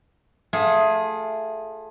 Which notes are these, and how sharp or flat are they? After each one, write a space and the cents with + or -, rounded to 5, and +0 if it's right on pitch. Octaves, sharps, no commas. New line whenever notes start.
A3 +0 F4 +30 G#4 +0